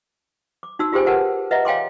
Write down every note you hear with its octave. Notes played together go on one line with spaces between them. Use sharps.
D6
D#4 F#4 E6
F4 G4 G#4 C5 G5 G#5
G4 A#4 B4 F#5 G#5 A5
B4 D#5 E5 F#5 A#5
C#5 F5 G5 G#5 C6 D6